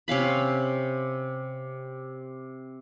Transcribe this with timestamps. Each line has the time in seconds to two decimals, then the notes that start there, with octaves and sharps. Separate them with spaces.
0.08 C3 C#4 F5 B5